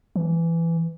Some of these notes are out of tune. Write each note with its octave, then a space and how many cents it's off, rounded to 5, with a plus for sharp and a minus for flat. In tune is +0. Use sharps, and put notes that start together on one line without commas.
E3 +15